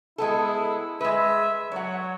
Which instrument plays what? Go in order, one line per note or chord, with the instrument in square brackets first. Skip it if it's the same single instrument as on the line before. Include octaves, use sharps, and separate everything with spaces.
[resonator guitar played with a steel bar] G#3 B3 A4 [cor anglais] E4
[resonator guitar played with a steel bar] G#3 B4 [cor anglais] E5
[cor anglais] F#3 [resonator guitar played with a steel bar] C#5 F#5